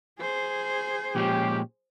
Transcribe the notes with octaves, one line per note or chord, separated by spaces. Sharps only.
G#4 C5
A#2 F3 G#3 C#4 G4